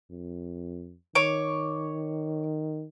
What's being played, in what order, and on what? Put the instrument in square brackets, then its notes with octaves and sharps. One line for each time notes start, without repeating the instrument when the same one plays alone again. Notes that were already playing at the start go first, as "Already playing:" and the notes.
[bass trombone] F2
[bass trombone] D#3 [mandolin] C#5 D6